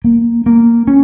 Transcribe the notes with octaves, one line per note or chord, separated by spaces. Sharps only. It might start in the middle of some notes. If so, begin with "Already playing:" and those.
A#3
A#3
C#4